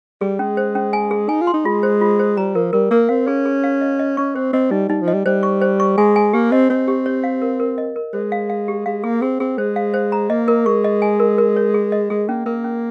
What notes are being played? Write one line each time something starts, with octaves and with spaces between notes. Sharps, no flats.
G3 G#4
G#3 C#4
C5
C#4
G#5
G#4
D#4 G#5
F4
C6
D#4
G#3 F4
C5
F4
C5
G3 A#5
F3 A#4
G3 A#4
A#3 A#4
C4 F5
C#4 G#4
G#4
F5
D#5
D#5
C#4 C#6
C4 C5
C4 D#5
G3 D#4
G3 D#4
F3
D#5
G3
G3 C5
C#6
C5
C#6
G#3 G#5
G#5
A#3 G4
C4 D#5
C4 C#5
G4
C#5
F5
A#4
A#4
D#5
A#4
G#3 C5
F5
F5
G4
G#3 F5
A#3 G#4
C4 G#4
C4 G#4
G#3 C5
F5
C5
A#5
A#3 D#5
A#4
G#3 C#6
D#5
G#5
A#4
A#4
C#5
G#4
D#5
G#3 G#4
A#3 C#4
A#3 A#4
C#4